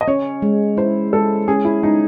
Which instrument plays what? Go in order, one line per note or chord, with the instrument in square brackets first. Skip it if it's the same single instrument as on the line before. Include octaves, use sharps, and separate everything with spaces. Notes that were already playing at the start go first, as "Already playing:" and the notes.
[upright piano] D#5
[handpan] C#4 [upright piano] C#5
[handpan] G#3
[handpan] E4 [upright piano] C5
[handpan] G#3 [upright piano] A4
[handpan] C#4 [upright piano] G#4
[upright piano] E4
[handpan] G#3 [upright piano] D#4